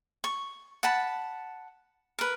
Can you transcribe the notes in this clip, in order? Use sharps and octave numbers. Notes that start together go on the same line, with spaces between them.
C#6
F#5 A5 B5
A#4 B4